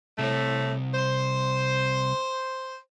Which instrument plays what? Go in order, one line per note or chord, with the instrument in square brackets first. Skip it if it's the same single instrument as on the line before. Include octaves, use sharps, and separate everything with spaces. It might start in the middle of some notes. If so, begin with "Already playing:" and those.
[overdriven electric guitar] C2 C3 [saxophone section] A2 A3
[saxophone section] C5